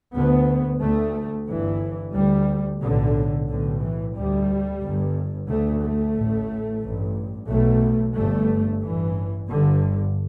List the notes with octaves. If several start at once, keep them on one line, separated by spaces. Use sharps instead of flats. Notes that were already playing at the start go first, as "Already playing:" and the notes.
D2 B3
D2 A3
G1 G2 E3
D2 G3
B1 A2 D3
B1 A2 D3
E3
D2 G3
G1 G2
D2 A3
A3
A1 A2
A1 G2
B1 B2 A3
G1 G2 A3
A1 G2 E3
G1 G2 D3